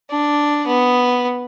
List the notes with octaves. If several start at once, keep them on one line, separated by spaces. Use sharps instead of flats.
D4
B3